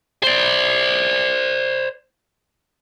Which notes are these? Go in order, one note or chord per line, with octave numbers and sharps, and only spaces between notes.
C5 D5